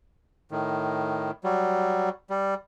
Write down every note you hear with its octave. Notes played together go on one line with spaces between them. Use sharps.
A2 D#3
F#3 G3
G3